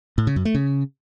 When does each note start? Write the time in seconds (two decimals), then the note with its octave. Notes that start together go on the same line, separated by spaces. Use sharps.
0.18 A2
0.27 C#3
0.36 F#2
0.45 A3
0.55 C#3